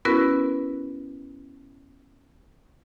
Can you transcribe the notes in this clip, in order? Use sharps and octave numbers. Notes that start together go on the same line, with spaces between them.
B3 C#4 E4 F#4 A#4 B4